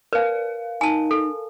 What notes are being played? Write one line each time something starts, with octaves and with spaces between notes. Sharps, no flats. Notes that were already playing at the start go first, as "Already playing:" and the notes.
A#4 B4 F5
D#4 G#5 A5
A4